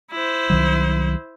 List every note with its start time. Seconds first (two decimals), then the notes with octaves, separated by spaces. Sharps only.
0.11 E4 C5
0.50 C2 D#3 F#3